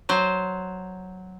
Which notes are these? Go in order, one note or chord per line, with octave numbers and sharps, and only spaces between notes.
F#3 C5